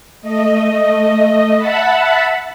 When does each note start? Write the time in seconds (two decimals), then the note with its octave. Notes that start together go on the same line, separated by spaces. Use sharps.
0.22 A3 D#5
1.57 E5 F#5 A5 B5